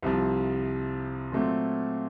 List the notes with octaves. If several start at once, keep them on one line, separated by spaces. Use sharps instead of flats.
C2 C3 F3
A#2 F#3 A3 C4